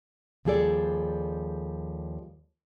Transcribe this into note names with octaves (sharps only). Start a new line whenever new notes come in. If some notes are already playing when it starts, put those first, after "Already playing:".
D#2 F3 G3 G#4 A4 D5